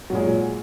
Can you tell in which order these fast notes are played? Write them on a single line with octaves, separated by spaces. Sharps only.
F#3 A#2 G#3